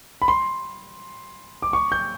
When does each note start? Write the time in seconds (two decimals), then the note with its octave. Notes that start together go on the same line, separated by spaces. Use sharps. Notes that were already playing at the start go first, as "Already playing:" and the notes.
0.22 B5
0.28 C6
1.62 D6
1.73 C#6
1.92 G6